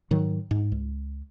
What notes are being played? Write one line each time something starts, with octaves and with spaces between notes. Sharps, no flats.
G#2 D#3 F#3
G#2
C#2